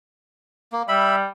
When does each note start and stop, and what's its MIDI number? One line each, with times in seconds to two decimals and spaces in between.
0.72 0.83 58
0.88 1.26 55
0.88 1.16 76
0.88 1.16 83